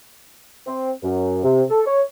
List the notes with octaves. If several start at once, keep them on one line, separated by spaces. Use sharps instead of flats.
C4
F#2
C3
A4
C#5